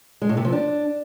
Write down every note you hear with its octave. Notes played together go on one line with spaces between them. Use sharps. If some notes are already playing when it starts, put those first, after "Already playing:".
G#3
A2
C3
F3
D4